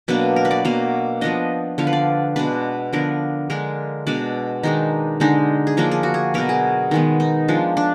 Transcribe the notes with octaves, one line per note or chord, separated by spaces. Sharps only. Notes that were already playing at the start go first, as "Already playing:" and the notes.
B2 F#3 A#3 D4 B4
A#4
B4
D5
B2 F#3 A#3 F5
F3 B3 D4 D#5
D3 F3 B3 F5
B4
D5
B2 G#3 D4 B4
D3 F3 B3 D4 A#4
D3 G#3 D4 A#4
B2 G#3 D4 D5
D#3 G#3 D4 D#4
D3 G#3 D4 D#4
G#4
F3 A#3 D4 A#4
G#4
F#4
G#4
B2 F#3 B3 A#4
G#4
D#3 G#3 B3
D#4
F3 G#3 D4
D4